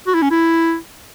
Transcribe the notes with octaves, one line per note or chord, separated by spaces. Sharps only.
F#4
E4
C#4
E4